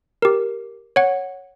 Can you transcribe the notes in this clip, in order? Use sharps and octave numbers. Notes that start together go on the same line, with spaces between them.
G4 A#4
C#5 F#5